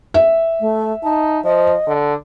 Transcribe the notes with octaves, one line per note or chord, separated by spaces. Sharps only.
E5
A3
D#4 A5
F3 D#5
D3